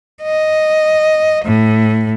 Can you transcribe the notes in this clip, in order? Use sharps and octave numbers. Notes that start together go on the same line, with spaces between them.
D#5
A2